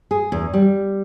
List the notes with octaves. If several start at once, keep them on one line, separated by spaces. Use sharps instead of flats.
G#4
E2
G3